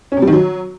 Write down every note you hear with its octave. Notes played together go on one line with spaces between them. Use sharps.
C#4
C3
G3
D#3
F#3